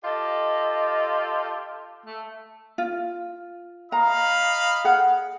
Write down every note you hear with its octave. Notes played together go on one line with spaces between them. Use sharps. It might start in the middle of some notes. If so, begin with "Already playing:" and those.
F4 G4 A4 D#5
A3
F4
D#5 F5 A#5 B5
G#4 F#5